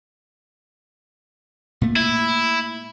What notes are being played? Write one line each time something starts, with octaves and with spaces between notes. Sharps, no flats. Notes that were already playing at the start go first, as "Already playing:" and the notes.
A#2 A3
E4